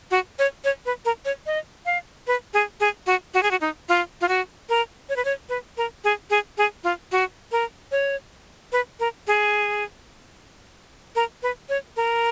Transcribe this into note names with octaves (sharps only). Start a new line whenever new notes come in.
F#4
C#5
C#5
B4
A#4
C#5
D#5
F5
B4
G#4
G#4
F#4
F#4
G#4
F#4
D#4
F4
F4
F#4
A#4
C#5
B4
C#5
B4
A#4
G#4
G#4
G#4
F4
F#4
A#4
C#5
B4
A#4
G#4
A#4
B4
C#5
A#4